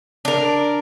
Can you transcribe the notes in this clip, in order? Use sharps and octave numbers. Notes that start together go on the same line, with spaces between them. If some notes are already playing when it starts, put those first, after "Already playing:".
D4 A#4